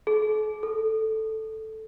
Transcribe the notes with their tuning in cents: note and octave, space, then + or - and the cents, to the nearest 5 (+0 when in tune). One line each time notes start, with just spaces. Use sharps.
A4 -45
A4 +0